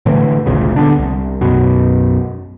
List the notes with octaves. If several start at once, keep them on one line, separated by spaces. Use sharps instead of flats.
A2 D3 E3
G#1 D2 A#2 C#3
D3 B3 D4
C2
B1 F#2 B2